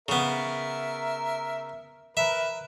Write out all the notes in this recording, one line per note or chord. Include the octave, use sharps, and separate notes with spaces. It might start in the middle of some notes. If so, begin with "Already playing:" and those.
C#3 B3 A#4 E5
A#4 B4 E5